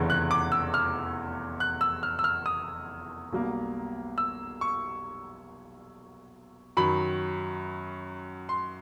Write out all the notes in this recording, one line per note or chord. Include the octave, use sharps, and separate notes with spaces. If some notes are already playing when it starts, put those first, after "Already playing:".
Already playing: F1 E2 C#3 E3
F#6
D6
E6
F6
F#6
E6
F6
E6
F6
D#6
B1 B2 G3 A#3
E6
C#6
F#2 D#3 F#3 B5
C6